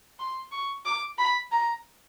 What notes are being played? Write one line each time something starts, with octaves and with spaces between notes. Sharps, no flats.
C6
C#6
D6
B5
A#5